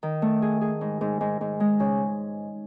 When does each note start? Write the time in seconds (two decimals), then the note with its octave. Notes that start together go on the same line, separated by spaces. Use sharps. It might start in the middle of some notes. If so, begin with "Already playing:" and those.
0.03 D#3
0.22 A3
0.42 G#4
0.61 G#4
0.81 G#2
1.01 G#2
1.21 G#2
1.41 G#2
1.60 G#3
1.80 C#3